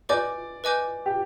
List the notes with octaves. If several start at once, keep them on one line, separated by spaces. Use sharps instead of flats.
B4 D5 D#5 G#5 D6 G6
B4 D#5 G#5 D6 G6
G4